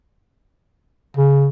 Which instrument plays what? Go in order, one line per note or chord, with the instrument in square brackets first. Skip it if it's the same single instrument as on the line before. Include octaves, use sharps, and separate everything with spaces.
[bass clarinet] C#3